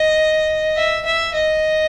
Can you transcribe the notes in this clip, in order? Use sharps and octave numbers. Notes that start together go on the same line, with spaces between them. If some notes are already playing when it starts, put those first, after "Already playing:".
Already playing: D#5
E5
E5
D#5